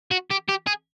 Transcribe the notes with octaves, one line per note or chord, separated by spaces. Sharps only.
F#4
G4
G4
G#4